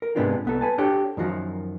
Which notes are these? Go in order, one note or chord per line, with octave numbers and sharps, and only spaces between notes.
A#4
G#2 C3 G#3 B3 D4 F4
C2 B3 A4
B4 G#5 A5
D4 F#4 G4 A4 C#5
F#2 D#3 F3 F#4